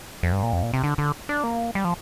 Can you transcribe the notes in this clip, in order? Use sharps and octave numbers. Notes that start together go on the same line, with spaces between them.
F2
G2
A#2
F2
A#2
C3
D3
D3
D4
A#3
G3
F3